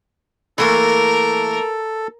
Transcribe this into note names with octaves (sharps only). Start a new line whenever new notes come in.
E3 A3 A#3 A4 A#4